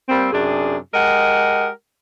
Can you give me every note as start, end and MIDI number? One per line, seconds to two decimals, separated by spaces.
0.09 0.29 55
0.09 0.29 58
0.09 0.29 60
0.33 0.77 42
0.33 0.77 48
0.33 0.77 62
0.33 0.77 68
0.94 1.69 56
0.94 1.69 67
0.94 1.69 70
0.94 1.69 75
0.94 1.69 78